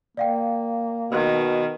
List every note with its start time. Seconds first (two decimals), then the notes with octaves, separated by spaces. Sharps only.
0.17 A#3 D5 F5 G5
1.12 B2 D#3